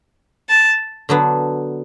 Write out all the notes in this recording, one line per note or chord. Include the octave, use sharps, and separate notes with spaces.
A5
D3 F#3 B3